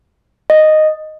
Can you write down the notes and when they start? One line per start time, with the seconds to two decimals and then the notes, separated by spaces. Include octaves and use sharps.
0.50 D#5